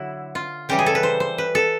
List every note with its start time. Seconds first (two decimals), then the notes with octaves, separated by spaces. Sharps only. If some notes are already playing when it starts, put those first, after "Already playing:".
Already playing: D3 F#3 E4 F#4
0.35 F4
0.69 C#3 E3 G3 G4
0.79 G#4
0.86 A4
0.95 B4
1.03 C5
1.20 C5
1.38 B4
1.55 A4